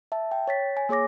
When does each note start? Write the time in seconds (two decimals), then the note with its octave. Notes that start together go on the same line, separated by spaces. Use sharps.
0.12 E5 A5
0.31 G5
0.47 C#5 A6 B6
0.77 G#5
0.89 A#3 G#4 C#5 D6 A#6